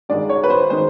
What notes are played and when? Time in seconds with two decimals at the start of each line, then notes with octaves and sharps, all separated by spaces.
0.09 G2 D#3 G#3 D5
0.29 C#5
0.44 B4
0.50 C5
0.69 D#3 G#3 C5